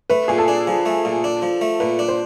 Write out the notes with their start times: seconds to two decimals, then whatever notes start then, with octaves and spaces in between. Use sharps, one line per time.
0.10 A3 B4
0.28 A#2 G#4
0.38 A4
0.48 D4
0.67 F3
0.86 A3
1.05 A#2
1.24 D4
1.42 F3
1.61 A3
1.80 A#2 B4
1.99 D4
2.08 C5